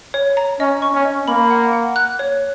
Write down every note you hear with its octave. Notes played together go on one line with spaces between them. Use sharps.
C#5
A#5
C#4 D#5
C#6
C#4
D#5
A#3 B5
F#5
F#5
F#6
C#5